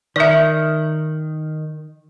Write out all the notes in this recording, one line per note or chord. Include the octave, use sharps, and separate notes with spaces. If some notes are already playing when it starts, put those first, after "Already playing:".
D#3 D5 E5